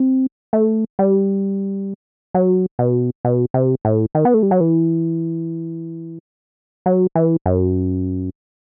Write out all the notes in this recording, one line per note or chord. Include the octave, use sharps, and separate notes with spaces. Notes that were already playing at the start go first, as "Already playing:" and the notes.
Already playing: C4
A3
G3
F#3
B2
B2
C3
A2
D#3
B3
A3
G3
F#3
E3
F#3
E3
F#2